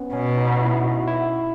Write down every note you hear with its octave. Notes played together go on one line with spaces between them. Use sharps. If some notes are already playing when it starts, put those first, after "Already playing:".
Already playing: B3 C#4
B2 C#4
D#4
E4
F#4
E4